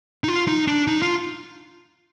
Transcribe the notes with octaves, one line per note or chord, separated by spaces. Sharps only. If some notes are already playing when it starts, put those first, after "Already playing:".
D#4
F4
D#4
D4
D#4
F4